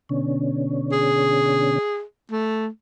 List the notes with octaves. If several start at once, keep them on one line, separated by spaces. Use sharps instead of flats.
B2 D3 C#4
G#4
A3